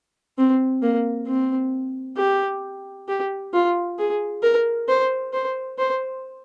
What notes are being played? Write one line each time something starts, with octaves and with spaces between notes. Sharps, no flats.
C4
A#3
C4
G4
G4
F4
G#4
A#4
C5
C5
C5